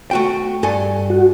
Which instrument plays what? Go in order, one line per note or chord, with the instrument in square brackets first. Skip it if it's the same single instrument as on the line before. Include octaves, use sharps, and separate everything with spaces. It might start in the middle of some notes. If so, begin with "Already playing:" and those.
[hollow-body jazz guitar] A3 F#4 G5
G2 A4 G#5
[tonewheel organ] F#4